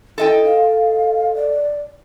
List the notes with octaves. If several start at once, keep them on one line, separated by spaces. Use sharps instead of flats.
E4 A4 D#5 G5
F5
D5